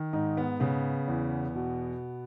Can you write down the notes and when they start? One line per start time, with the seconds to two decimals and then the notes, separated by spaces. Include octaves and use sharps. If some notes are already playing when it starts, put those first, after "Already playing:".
Already playing: D#3
0.13 G#2 D#4
0.37 B3
0.60 C#3 B3
1.08 E2
1.55 B2